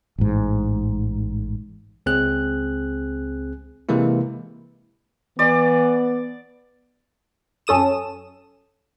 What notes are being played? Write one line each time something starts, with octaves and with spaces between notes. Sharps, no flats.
A1 G#2
C#2 C4 G#4 F#6
C3 E3 G#3 A#3 E4
E3 B3 D5
F#2 C#4 A4 D#6 E7